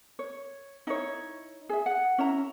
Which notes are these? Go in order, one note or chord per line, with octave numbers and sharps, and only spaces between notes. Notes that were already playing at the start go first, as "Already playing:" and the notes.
C#5
D#4 E4 C#5
G#4 E5
F#5
C#4 E4 A#5